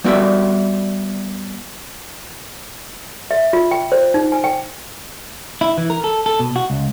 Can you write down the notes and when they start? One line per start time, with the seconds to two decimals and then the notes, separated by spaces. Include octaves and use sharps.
0.04 G3 B3 F#4 D5 E5
3.31 E5
3.53 F4
3.71 G5
3.92 C5
4.14 D#4
4.32 G#5
4.44 G5
5.61 E4
5.78 E3
5.90 A#4
6.04 A4
6.26 A4
6.40 B2
6.56 F#4
6.70 C#2